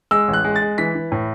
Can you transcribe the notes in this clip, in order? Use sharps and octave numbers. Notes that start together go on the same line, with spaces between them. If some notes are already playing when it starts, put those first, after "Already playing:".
G#3 E6
A1
F#6
G#3
A6
G#3
E3 B6
E3
A2